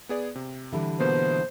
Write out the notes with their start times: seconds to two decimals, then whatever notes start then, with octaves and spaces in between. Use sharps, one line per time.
0.09 B3 G#4 D5
0.35 C3
0.72 D3 E3 G3
1.00 B2 A#3 B3 C5